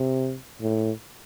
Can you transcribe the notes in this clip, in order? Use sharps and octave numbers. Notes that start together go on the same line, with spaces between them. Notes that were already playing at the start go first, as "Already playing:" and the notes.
Already playing: C3
A2